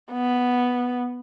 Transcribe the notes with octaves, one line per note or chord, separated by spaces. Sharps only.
B3